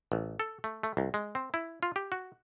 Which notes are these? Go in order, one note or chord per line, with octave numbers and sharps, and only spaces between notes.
A1
A4
A3
A3
C2
G#3
C4
E4
F4
G4
F#4